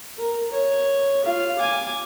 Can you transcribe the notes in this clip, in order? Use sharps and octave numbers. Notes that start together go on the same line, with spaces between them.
A#4
C#5
F4 F5
G#5 D6